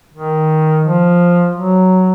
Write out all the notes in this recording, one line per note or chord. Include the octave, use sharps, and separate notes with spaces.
D#3
F3
F#3